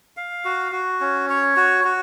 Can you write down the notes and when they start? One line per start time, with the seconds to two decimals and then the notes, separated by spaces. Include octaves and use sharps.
0.17 F5
0.45 F#4
0.72 F#4
1.01 C#4
1.29 C#5
1.56 F#4
1.85 F#4